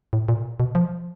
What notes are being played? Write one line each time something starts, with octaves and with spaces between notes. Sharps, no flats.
A2
A#2
B2
F3